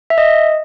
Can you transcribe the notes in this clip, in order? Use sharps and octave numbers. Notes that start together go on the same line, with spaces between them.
E5
D#5